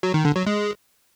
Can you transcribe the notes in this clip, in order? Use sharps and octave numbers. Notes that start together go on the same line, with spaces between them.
F#3
D#3
D3
F#3
G#3